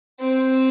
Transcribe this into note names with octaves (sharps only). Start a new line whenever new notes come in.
C4